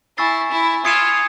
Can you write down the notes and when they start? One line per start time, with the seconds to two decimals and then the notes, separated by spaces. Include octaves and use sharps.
0.18 E4 G#5 C#6 E6 A6 C7
0.51 E4
0.85 F4 D#6 G#6 C#7 E7